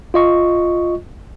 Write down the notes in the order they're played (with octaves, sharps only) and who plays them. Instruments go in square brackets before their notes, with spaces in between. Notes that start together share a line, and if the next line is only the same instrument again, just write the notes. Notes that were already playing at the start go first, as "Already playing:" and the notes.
[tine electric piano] F4 D#5 C#6